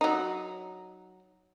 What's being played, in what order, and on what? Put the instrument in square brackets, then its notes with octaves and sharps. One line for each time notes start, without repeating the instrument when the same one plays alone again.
[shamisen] F#3 D#4